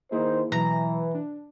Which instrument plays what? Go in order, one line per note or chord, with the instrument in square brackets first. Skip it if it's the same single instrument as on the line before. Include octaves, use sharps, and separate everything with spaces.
[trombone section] D#3 D#4 C5 [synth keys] A#3 E4 G#4
[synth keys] B2 F#3 [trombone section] E3 [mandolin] A#5
[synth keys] D4